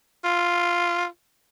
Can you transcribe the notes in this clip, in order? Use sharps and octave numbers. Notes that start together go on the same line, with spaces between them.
F4